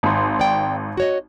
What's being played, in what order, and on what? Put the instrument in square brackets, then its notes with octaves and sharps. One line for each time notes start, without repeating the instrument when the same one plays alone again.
[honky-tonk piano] G#1 C6
[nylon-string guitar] D5 G5
F#4 C#5 D#5